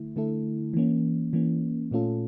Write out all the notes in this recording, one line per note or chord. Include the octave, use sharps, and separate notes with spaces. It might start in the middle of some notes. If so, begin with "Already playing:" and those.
Already playing: D3 A3 E4
D3 A3 E4 A4
E3 A#3 C#4
E3 A#3 C#4
A#2 A3 C#4 F4 A4